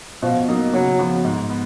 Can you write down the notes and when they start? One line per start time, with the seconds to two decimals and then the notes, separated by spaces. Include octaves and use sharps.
0.22 B2 F3
0.49 F#3 A#3 D#4
0.73 C#3 F#3
0.99 F3 B3 F#4
1.25 G#2
1.49 B3